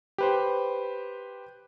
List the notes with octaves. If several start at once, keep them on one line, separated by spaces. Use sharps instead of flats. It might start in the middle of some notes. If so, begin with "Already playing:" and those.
G4 B4 C5